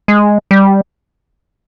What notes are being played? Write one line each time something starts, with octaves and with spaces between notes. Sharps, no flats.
G#3
G3